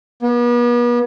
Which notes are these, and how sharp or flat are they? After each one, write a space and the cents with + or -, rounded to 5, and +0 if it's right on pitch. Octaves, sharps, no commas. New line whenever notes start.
B3 -40